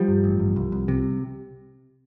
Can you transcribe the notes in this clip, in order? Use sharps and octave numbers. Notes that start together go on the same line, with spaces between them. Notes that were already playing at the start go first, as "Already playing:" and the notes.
Already playing: F3 G3
G2
A1
G2
C2
C2
C3